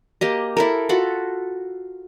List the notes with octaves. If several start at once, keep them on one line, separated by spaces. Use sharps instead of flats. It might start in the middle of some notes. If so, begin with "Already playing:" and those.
A#3 G4 D#5
E4 A4 A#4
F4 F#4 A4 B5